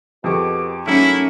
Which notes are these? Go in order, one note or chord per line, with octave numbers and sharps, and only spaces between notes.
F2 B2 G4 G#4 C#6 D6
G#2 F#3 A3 A#3 C#4 E4 C#7